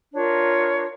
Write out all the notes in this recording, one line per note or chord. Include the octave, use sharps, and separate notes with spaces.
D4 F4 A#4 C#5